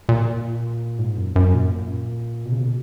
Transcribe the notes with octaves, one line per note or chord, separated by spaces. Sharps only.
A#2
G#2
F#2
F#2
A#2
B2
C#3
B2